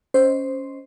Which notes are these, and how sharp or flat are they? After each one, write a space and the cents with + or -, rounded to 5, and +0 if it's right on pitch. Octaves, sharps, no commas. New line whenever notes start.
C#4 +0 C5 +0 D#5 +0